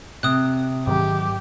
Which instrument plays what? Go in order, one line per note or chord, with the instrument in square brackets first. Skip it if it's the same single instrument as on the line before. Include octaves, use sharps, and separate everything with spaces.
[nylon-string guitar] C3 [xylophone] D#6 F#6
[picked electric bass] G#2 D#3 F#3 [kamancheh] G4